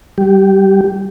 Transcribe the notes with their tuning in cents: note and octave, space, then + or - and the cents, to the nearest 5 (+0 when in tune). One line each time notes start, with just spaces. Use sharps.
G3 -15 G4 -15